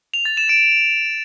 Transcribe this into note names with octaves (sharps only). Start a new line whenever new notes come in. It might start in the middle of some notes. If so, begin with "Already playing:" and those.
F7
A6
E7
D7